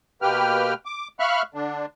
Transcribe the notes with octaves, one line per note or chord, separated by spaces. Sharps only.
B2 A#3 G4 B4 G5 F6
D6
E5 F5 B5 C#6 F6 F#6
D3 D4